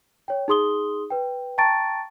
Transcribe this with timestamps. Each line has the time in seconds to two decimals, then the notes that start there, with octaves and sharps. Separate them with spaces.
0.28 C#5 G5
0.48 D#4 G#4 C6 D#6 G7
1.10 B4 G5
1.58 G5 A5 A#5 C#6 A6 D7